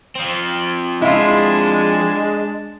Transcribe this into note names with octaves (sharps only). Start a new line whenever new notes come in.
F3 C4
G#3 D4 E4 F4 A5